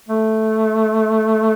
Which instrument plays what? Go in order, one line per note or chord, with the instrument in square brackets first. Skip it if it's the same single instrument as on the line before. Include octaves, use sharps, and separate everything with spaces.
[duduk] A3